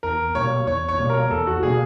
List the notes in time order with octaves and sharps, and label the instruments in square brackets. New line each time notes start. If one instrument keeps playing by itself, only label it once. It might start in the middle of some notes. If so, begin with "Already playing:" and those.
[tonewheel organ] E2 [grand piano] A#4
[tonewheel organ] B2 G3 A#3 [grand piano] C#5
[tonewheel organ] E2 [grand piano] C#5
[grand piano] C#5
[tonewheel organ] B2 G3 A#3
[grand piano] A#4
[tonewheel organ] E2 [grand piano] A4
[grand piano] F#4
[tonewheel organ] B2 G3 A#3 [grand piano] G#4